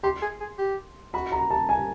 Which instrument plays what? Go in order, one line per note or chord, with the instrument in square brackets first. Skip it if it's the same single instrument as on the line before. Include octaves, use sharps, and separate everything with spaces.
[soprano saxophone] G4 [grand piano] C6
[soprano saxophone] G#4
G#4
G4
[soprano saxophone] F#4 [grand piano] B5
[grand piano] A#5
A5
G#5